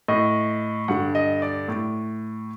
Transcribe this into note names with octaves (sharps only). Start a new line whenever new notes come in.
A2 D#5
G2 D3 F#5
D#5
D5
A2